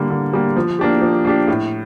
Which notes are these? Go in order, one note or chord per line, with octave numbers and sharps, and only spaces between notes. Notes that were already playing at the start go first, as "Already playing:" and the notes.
Already playing: D3 G3 A#3
D3
G3 A#3
F3
A#3 D4 G4
F3
A#3 D4 G4
A2